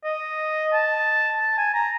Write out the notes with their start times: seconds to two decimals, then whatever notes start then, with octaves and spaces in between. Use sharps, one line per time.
0.04 D#5
0.73 A5
1.40 A5
1.58 G#5
1.74 A#5